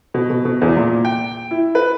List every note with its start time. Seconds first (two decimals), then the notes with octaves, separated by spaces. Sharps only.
0.14 B2
0.30 B2
0.45 B2
0.62 E2
0.77 A#2
1.05 G5
1.51 E4
1.75 B4